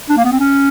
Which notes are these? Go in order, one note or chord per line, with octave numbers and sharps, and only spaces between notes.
D4
A#3
B3
C4
C#4